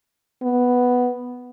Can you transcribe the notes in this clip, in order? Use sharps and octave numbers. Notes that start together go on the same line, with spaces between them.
B3